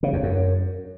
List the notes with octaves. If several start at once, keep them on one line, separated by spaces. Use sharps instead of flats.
C#3
E2
F#2